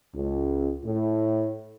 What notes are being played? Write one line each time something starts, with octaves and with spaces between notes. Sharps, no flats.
C#2
A2